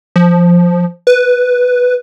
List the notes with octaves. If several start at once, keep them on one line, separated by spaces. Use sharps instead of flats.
F3
B4